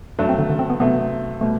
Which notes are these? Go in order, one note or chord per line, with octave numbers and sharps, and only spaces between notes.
G2 F#3 A3 D4
C4
D3
D3
C4
B3
C3 F#3 A3 B3
B2 G3 A3